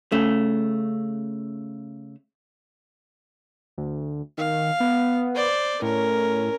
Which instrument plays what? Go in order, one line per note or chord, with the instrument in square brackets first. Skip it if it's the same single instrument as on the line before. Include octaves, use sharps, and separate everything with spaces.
[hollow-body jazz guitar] C#3 A3
[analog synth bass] D2
[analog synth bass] D#3 [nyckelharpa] F5
[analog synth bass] B3
[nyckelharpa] C5 D5
[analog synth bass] A2 [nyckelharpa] C#4 A#4